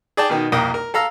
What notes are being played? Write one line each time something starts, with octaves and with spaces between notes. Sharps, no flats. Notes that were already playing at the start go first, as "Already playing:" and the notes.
G#4 D5 G5 A5
B2 D#3
C2 F2 A#3 G5 D#6
A#4
A4 F5 A#5 E6